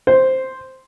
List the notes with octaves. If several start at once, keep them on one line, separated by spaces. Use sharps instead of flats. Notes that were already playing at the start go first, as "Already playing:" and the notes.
C5